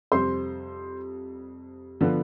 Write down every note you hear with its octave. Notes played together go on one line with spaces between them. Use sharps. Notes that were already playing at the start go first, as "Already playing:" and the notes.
F2 C3 G3 C5 C6
D3 F3 B3